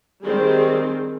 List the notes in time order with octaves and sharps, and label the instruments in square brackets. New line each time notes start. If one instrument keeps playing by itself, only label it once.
[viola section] D#3 G3 C4 G#4